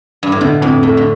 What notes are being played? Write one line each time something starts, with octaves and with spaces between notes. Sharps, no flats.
G2
A2
B2 D3
F2 A2
A2 A3
D3